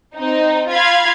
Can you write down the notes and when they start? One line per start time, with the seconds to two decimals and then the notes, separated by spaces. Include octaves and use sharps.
0.17 C4 D#4
0.72 F4 F5 B5 G#6